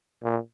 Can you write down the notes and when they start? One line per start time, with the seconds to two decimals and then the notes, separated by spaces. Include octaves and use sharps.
0.23 A#2